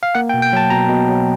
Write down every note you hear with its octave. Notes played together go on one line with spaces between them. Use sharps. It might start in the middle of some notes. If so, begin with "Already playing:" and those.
F5
A#3 F#5
G5
B2
G5
F#3 A5
B2 A#5
B2
F#3